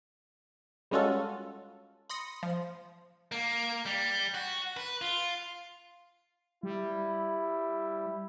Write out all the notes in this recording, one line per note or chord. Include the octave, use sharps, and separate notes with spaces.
G3 G#3 C#4 F4 F#4 A4
B5 C6 D#6 A#6 C#7
F3
A#3
G3
F#4
B4
F4
G3 E4